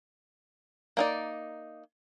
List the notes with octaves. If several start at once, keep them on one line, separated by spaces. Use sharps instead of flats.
A#3 D#4 D5